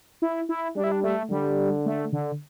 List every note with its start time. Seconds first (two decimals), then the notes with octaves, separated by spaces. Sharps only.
0.22 E4
0.49 E4
0.76 G3 D4
0.84 E4
0.92 D4
1.04 A3
1.31 D3 G3
1.86 A3
2.12 D3